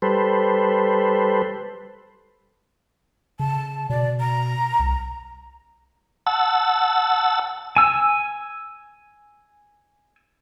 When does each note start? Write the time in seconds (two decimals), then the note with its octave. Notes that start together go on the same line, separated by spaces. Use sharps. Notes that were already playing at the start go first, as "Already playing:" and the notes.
0.02 G3 A4 B4 C5
3.40 C#3 A5
3.90 B2 D5
4.20 A#5
4.80 C2
6.27 F#5 A5 E6
7.77 G#5 E6